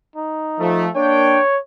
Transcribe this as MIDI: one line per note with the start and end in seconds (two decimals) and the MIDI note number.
0.16 0.84 63
0.59 0.89 53
0.59 0.89 57
0.96 1.39 58
0.96 1.39 62
0.96 1.59 73
0.96 1.39 79